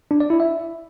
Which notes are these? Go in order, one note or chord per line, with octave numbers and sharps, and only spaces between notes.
D4
D5
E4
E5